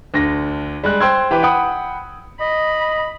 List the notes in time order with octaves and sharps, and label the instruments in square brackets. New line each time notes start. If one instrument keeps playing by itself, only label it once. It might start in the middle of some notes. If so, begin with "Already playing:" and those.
[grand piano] D2 D3 A#6
G3 G#3 F#6
C5 G5 C6 E6 G#6
E3 G4 B4
F#5 G5 B5 D#6
[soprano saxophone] D#5 [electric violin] B5